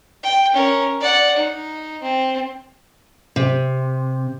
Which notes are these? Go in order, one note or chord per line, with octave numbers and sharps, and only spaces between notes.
G5
C#4 A#4
D5 F#5
D#4
C4
C3